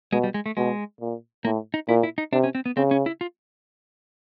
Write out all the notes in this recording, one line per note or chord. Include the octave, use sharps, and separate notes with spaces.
B2 G#3
G3
G#3
A3
B2 G#3
A#2
A2 A#3
D#4
A#2 E4
E4
D#4
C3 D4
C#4
C4
B3
C#3 C4
C#4
E4
F4